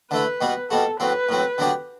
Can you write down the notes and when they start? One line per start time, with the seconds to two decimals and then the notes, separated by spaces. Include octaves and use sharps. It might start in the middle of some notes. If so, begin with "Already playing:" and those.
0.11 D3 A3 E4 B4
0.41 B2 G3 B3 F#4
0.70 B2 G3 B3 F#4 A4
1.00 A2 F#3 C4 B4
1.29 A2 F#3 C4
1.58 D3 F#3 B3 D4 G4